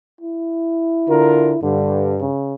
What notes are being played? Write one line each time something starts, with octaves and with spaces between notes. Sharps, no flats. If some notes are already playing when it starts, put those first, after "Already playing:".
E4
D3 F4 A#4
G2 D3
C#3